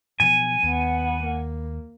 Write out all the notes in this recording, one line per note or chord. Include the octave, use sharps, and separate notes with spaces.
B2 F3 F#3 G#5
D#2 B3 F#5
A#3